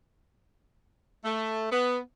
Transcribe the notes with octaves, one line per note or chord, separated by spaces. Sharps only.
A3
B3